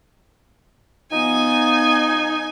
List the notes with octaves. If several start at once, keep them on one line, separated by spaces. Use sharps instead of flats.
F3 B3 D#4 G#5